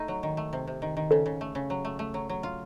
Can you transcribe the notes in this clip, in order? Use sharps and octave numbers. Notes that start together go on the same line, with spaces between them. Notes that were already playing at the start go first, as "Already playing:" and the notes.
Already playing: A3 D#4
F#3
D#3
A3
C3
C3
D#3
D#3
C#3 A4 C5
C#3
A3
C#3
F#3
A3
A3
F#3
F#3
F4